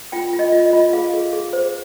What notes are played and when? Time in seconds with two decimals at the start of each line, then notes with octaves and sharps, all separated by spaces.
0.12 F4 G5
0.33 F4
0.39 D#5
0.52 F4
0.66 D#5
0.73 F4
0.93 G#4 F5
1.14 G#4
1.33 G#4
1.53 C5